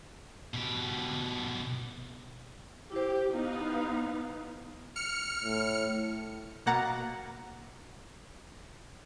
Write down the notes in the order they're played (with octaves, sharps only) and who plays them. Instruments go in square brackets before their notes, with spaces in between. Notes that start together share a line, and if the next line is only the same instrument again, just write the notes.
[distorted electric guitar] B2 G4
[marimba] E4 C5 [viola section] G4
[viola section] B3 D#4 F5
[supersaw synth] F6 C#7
[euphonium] A2
[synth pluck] B2 A#3 F#5 A#5 A6